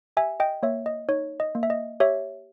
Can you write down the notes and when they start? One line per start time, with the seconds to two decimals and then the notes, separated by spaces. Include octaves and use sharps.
0.17 G4 E5 G#5
0.40 D#5 G5
0.63 A#3 C#5 E5
0.86 D#5
1.09 D#4 C#5
1.40 D#5
1.55 A#3
1.63 E5
1.70 D#5
2.00 G4 C#5 E5